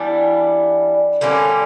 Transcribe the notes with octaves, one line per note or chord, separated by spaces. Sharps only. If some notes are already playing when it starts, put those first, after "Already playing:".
Already playing: E3 G3 B3 D4
D3 G3 A#3 C#4